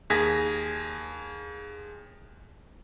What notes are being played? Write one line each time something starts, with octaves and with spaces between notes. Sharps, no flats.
D#2 G#4 G#5 G#6 A#6 B6